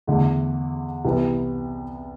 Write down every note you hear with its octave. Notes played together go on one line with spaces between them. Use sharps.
E2 D3 A3
C2 C3 E3 B3